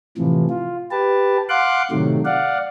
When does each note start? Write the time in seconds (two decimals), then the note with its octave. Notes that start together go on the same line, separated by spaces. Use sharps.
0.18 A2 C3 E3 F3
0.50 F4
0.91 G4 B4 A5
1.49 F5 F#5 C6 D6 F#6
1.91 A2 C3 D#3 F#3 A3
2.25 D5 F5 F#5